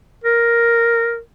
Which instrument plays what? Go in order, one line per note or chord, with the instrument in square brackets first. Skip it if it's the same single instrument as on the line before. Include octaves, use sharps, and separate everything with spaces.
[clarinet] A#4